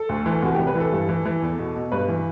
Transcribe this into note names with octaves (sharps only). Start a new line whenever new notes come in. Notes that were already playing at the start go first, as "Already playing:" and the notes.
Already playing: A4
D2
E3
C2 F#4
C2 G4
B4
E3 A4
G2
E3
E3
E2
B2
B2
G2 B4
E3